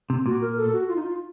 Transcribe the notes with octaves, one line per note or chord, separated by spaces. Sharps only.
C3
A#2 F#4
A#4
A4
F#4
F4
D#4
F4